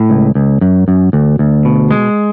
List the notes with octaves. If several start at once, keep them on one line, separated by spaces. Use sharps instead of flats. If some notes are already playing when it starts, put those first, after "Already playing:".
Already playing: A2
C#2
C#2
F#2
F#2
D2
D2
B2
G#3